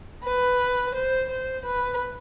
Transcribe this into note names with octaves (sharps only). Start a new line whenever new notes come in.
B4
C5
C5
B4